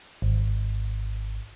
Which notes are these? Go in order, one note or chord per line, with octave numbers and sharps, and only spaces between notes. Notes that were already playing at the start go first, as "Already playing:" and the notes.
G#1